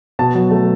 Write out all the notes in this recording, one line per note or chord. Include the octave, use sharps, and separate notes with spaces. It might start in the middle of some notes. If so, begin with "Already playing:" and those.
B2 A5
F#3
A3